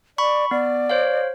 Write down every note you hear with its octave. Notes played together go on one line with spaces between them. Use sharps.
D5 B5 C#6
B3 D5
C5 C#5 F5